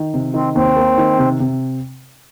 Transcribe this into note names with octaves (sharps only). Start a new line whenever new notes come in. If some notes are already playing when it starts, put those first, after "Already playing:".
Already playing: D#3
C3
D#3 C4
D#2 C4
A#3
D#3
C3
C3